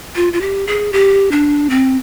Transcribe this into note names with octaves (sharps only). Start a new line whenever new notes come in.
F4
F4
G4
G#4
G4
D4
C4